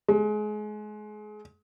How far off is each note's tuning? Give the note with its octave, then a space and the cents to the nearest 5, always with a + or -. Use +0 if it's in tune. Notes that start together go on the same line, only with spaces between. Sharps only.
G#3 +30